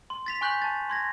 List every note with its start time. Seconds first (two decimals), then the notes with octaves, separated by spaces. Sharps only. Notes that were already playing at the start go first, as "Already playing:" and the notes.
0.10 C6
0.26 A6 B6 F7
0.41 G#5 C#6 F#6 G6 B6 F#7
0.62 A5 A6
0.90 C6 G#6 A#6